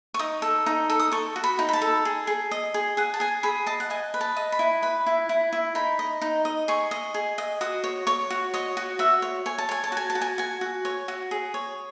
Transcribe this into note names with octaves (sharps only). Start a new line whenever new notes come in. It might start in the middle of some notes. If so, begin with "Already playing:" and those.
C#6
D#4 D#6
A4
D#4
A4
D#6
A4 C#6
F#4
B5
D#4
B5
A5
A4
G#4
G#4
D#5
G#4
G#4 F#5
A5
G#4 G#5
G#4 B5
D#5 A5
F#5
D#5 G#5
B4
A5
D#5
B5
E4
B4 B5
E4
E4
E4
D#4 B5
D#5
D#4
D#5
G#4 C#6
D#5
G#4
D#5
F#4 D#6
C#5
C#5 C#6
F#4
C#5 D#5
F#4
F#4 E5
C#5
C#5 G#5
A5
C#5 G#5
A5
F#4 G#5
A5
F#4
G#5
F#4 G#5
F#4
C#5
F#4
G#4
C#5